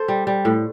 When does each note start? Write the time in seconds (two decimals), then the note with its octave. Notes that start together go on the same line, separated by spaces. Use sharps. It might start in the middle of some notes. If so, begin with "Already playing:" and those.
Already playing: A4 C5
0.08 G3
0.27 G3
0.45 A2